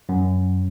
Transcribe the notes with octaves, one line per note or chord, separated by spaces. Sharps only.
F#2